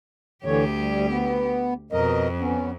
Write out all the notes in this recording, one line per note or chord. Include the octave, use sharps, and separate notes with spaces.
D2 D3 E3 G4 C#5
G3
B3
F2 B2 A#4 D#5
B3 C#4